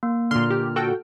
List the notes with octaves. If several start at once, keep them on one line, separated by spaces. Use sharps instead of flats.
A#3
A#2 D3 C6 F6
G4
F#4 A4 G5